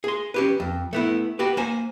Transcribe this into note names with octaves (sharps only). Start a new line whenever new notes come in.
G#4 C6
C#4 G4 B4
F2
A3 B3 E4
F#4 G4 B4
A#3 C5 G#5